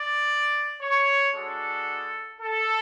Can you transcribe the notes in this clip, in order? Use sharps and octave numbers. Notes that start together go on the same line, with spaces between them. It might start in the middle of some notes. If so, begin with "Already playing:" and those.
Already playing: D5
C#5
G#3 D4 F#4 A4
A4